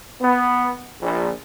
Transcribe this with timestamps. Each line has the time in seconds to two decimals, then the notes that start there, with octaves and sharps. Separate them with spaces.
0.21 B3
1.01 A#1